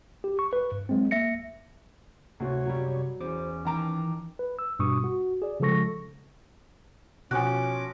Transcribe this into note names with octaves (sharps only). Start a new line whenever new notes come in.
G4
C#6
B4
G2
F#3 G#3 C4
A#3 E5 A#6 C#7
D2 C3 F#4 C#5
F#2 F#3 G3
E2 C#4 C5 D6
D#3 E3 G5 A5 A#5 D6
B4
E6
G2 B2 C#6 D#6
F#4
G#4 D5
C#3 F3 G#3 A4 C#6 A#6
B2 F3 C#4 F#4 G#5 D6 F#6